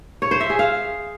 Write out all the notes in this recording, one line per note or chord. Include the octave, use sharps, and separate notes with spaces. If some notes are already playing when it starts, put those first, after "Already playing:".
C#5
C5
E5
G#4
F5